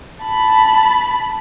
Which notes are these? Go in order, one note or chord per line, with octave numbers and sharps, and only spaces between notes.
A5 B5